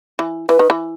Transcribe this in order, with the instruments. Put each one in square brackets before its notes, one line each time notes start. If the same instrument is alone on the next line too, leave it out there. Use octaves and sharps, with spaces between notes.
[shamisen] E3
[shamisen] E3 [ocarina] B4
[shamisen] D#3
E3